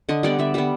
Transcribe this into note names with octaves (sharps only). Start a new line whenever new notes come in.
D3 D#5
G3 B3 D5
D3 E5
G3 B3 E5